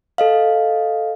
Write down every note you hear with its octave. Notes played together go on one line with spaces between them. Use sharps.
A4 D#5 F5